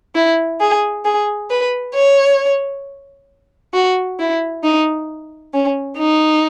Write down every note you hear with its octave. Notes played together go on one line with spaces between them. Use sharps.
E4
G#4
G#4
B4
C#5
F#4
E4
D#4
C#4
D#4